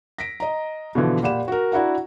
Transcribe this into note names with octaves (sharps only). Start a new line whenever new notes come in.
A#6 B6 D7
D#5 A#5
B2 D3 E3 F3
A#2 G4 D5 F#5 B5 E7
F#4 A#4
D4 E4 F#4 F#5 A#5